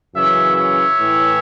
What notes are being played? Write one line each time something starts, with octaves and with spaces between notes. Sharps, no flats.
F#2 C#3 E3 C#5 E5
C#5 E5
A2 E3